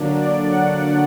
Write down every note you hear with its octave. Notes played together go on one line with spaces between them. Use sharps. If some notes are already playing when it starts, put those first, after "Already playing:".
Already playing: D3 F#3 A#3 D4
D5
F#5